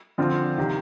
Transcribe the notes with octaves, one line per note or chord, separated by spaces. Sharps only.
D3 F3 C4 F4
C3 D#3